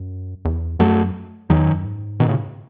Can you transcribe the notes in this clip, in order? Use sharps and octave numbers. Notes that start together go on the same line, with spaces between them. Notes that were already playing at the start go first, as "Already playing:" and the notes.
Already playing: F#2
E2
F#2 F#3 A3
E2 D#3 F#3
F#2
G#2
B2 D#3
A2 C#3